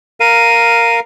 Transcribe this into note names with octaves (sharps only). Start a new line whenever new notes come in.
A#4 F5 D#7